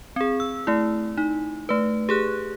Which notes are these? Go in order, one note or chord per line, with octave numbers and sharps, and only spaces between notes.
C4 G#4
E6
A3 E4
D#4
A3 B4
G4 G#4 F#6